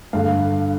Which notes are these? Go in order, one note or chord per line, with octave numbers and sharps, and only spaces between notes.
G2 D3 F5